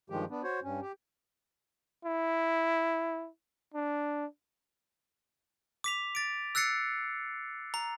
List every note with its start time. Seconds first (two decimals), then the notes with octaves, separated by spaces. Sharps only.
0.10 G2 D#3 F3 G#3 G4
0.30 B3 D4
0.43 F#4 C5 C#5
0.63 G2 C#4
0.82 G4
2.05 E4
3.74 D4
5.84 D6 B6 F7
6.15 A6 D7
6.55 E6 F#6 A6 C7 C#7
7.74 A#5